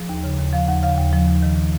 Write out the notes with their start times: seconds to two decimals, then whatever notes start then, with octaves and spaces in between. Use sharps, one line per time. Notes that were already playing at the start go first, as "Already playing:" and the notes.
Already playing: F3 G#4
0.09 D#2
0.24 C#3
0.38 D#2
0.53 F3 F5
0.68 D#2 F#5
0.83 C#3 F5
0.98 D#2
1.13 F3
1.28 D#2
1.42 D#3
1.57 D#3